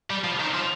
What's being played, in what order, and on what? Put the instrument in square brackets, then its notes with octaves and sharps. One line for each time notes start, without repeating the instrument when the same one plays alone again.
[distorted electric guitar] G3
F3
D#3
F3